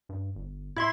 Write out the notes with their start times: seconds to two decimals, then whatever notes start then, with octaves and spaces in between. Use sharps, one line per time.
0.09 G2
0.35 G1
0.76 A2 E4 E5 C6